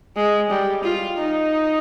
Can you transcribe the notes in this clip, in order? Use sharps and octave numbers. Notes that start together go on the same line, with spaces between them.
G#3
G3
F4
D#4